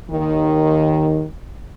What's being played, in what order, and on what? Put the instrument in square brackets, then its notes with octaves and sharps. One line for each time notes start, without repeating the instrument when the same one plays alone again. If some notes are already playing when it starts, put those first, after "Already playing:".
[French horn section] D#2 D#3